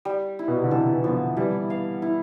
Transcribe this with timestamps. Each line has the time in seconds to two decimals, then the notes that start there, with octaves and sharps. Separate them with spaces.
0.05 G3
0.39 E4
0.48 B2
0.56 C3
0.64 D3
0.71 C3 E3 A4
0.94 E3
1.04 D3 F3 B3
1.37 E3 G3 E4
1.70 F5
2.02 E4